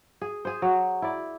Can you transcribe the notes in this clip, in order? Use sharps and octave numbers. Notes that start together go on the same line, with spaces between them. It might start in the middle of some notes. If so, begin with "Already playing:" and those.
G#4
G#4 C5
F#3
E4 D5